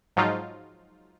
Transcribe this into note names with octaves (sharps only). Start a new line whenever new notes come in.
G#2 F3 F#3 D#4 F4